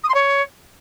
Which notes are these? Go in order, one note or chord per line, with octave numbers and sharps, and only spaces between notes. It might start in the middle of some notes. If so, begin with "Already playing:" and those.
D#6
C6
C#5